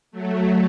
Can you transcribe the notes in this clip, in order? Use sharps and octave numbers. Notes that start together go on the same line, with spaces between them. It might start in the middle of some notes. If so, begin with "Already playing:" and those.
F#3 A3